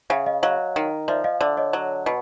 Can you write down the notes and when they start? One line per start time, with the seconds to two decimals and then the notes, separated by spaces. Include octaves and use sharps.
0.10 C#3 E5 F#5
0.26 D#5 F5
0.43 F#3 D#5 F5
0.76 D#3
1.08 F3 D5 E5
1.24 D#5 F5
1.41 D3 D5 E5
1.57 C#5 D#5
1.73 F#3
2.06 B2